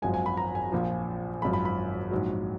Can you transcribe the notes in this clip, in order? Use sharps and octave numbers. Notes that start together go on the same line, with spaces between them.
G#1 F#2 F3 G#3 G#5
G#5
B5
A#5
G#5
A#1 A#2 F3
G#1 F#2 F3 G#3 B5
B5
B5
A#1 G#2 F#3